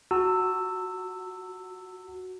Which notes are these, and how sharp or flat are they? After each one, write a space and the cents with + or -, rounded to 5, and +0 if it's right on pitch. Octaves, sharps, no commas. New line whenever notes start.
F#4 +0 A5 +45 E6 +0